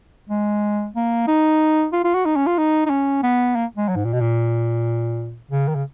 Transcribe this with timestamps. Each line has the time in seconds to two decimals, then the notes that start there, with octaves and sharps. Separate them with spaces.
0.30 G#3
0.96 A#3
1.27 D#4
1.93 F4
2.04 F4
2.14 F#4
2.26 D#4
2.36 C#4
2.47 F4
2.58 D#4
2.86 D#4
2.90 C#4
3.23 B3
3.56 A#3
3.77 G#3
3.89 F#3
3.96 G#2
4.05 A#2
4.13 B2
4.21 A#2
5.51 C#3
5.68 D#3
5.75 C#3